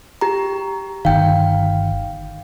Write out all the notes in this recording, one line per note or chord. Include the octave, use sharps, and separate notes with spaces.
G4 A#5
G1 D#3 F5 G5